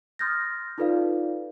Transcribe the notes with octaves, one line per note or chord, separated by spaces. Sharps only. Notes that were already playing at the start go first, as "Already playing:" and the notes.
C6 D#6 F6 G6 A6 A#6
D#4 F4 A4 B4 D5 F5